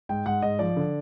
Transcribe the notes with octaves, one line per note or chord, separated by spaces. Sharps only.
G#2 G5
G#2 F#5
G#2 D#5
F3 D5
D3